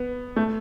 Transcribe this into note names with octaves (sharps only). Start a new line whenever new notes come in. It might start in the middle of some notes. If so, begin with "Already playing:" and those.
Already playing: B3
A3